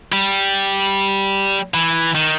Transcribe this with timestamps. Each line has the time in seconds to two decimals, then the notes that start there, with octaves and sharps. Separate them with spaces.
0.12 G3
1.74 E3
2.15 D#3